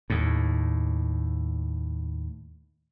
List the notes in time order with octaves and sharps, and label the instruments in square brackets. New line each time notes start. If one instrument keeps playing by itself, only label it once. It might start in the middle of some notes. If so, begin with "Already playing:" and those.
[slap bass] D#2 A2